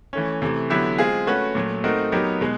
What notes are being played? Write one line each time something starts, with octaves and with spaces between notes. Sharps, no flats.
E3 A3 C#4
C3 E3 A3
D3 F#3 B3 E4 G4
G#3 C4 F4 G#4
A3 C#4 F#4 B4
A#2 F#3 A3
A3 C4 D#4 F#4 A#4
F#3 B3 D#4 G4 A#4
B2 G#3